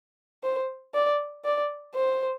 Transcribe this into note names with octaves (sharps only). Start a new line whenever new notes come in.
C5
D5
D5
C5